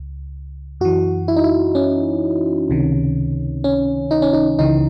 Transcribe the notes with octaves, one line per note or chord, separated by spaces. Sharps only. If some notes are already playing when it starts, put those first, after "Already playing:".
Already playing: C#2
F#2 E3 F#4
E4
D#4
E4
C#4
C#2 C3 D#3
C#4
D#4
C#4
D#4
C#2 C#3 E3 D#4